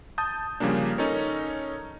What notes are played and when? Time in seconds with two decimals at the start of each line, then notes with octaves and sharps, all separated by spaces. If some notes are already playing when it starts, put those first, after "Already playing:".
0.18 A5 D#6 G6
0.60 C#3 F3 G3 A#3 D4
0.98 C#4 D#4 A4 A#4 C#5